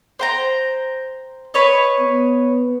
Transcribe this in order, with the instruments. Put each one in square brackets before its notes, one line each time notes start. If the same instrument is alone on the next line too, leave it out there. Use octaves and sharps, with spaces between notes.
[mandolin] C5 G5 A#5
B4 C#5 D#5
[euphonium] B3